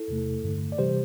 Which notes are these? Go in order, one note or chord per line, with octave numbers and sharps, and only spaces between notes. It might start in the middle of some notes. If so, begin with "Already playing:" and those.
Already playing: E4 A4
E2 C3 A3
G2 D3 A3
D5
C3 E3 G3 G4 C5